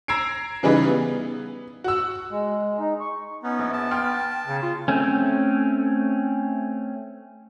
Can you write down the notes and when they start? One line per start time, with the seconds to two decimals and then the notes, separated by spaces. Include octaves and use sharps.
0.08 A#5 E6 G#6 C7 D7
0.63 C#3 E3 G3 D#4 G#4 B4
0.86 B3
1.84 F#4 E6
2.31 G#3
2.79 D#4
3.00 C#6
3.44 B3 C#4 D#4
3.59 A#1
3.73 A5
3.91 G5 C6 F6
4.47 C#3
4.62 F4
4.88 A3 C4 C#4